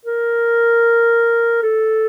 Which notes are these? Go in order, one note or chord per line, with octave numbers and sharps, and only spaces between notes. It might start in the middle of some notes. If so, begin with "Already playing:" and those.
A#4
A4